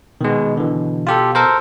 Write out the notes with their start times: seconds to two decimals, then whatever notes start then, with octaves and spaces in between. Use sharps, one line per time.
0.21 B2 D#3 G#3
0.57 D3 E3
1.07 F4 G4 A4
1.35 A4 A#4 C5